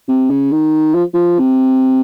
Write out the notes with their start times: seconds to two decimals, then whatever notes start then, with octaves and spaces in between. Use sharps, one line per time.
0.08 C3
0.30 C#3
0.51 D#3
0.95 F3
1.14 F3
1.39 C3